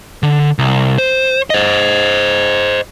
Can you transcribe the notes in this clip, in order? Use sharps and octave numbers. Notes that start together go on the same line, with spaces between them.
D3
C2
C5
C5 D#5